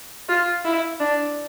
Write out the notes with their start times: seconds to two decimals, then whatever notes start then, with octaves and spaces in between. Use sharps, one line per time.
0.29 F4
0.65 E4
1.00 D4